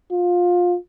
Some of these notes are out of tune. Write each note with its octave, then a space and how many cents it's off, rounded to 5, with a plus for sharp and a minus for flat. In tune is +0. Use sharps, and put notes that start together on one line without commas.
F4 +20